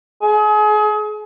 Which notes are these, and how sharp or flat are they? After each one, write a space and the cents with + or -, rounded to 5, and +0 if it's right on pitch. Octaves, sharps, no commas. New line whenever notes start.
G#4 +35